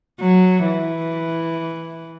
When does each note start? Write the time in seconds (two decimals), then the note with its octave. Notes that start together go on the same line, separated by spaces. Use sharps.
0.20 F#3
0.65 E3